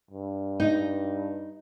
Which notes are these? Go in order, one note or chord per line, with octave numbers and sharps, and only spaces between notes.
G2
D#4